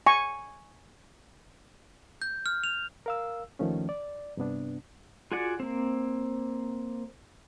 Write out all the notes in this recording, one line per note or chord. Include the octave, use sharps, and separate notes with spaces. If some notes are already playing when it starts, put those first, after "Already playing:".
G#5 C#6
G6
F6
F7
A#4 F5 E6
D#2 D#3 F3 A3 C#4
D5
G2 C3 B3 D4
F4 F#4 G#4 D5 F#5
A#3 C4